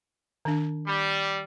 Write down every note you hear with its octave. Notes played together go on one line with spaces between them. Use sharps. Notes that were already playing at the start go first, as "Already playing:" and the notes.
D#3 D4
G3